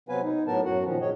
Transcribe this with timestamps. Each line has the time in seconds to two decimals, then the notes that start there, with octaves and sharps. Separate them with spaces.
0.09 C3 F#3 B3 B4 F5 G#5
0.23 D#4
0.47 A2 F#3 B3 A#4 A5
0.65 F#2 F#3 F#4 F#5
0.84 A#2 D#3 F3 C#4
1.01 G2 A#2 C#3 F#3 C#5 D#5